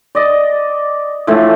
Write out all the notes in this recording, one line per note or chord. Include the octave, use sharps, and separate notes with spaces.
D5 D#5
A2 E3 F3 A3